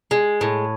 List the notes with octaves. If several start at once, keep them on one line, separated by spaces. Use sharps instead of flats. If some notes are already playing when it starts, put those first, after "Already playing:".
G#3
A2